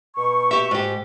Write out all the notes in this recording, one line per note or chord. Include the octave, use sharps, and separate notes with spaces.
B2 C#6
G4 E5
G#2 G4